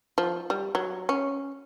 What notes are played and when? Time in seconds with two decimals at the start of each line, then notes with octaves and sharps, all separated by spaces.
0.18 F3
0.50 G3
0.75 F#3
1.09 C#4